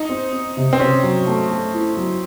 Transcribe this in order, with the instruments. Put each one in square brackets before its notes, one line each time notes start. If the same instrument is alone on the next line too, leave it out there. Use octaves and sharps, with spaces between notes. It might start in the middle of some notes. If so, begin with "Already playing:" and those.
Already playing: [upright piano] D#4
[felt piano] C4
C4
C3
[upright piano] C4
[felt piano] C3 [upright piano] C#4
[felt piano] F#3
A3
A3
E4
F#3